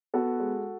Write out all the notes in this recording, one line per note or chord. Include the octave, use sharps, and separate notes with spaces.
B3 F#4 A4
G#3